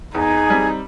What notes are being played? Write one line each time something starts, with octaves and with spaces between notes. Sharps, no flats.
E2 D#4 G#4
G3 C4